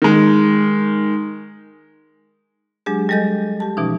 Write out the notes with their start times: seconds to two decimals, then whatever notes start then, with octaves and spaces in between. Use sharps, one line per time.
0.02 D#3 G#3
2.86 F#3 G#3 D4 G4 G#4
3.09 G3 G#3 A4 D#5 G6
3.60 G4 A5
3.77 B2 E3 F3 C#4 D#4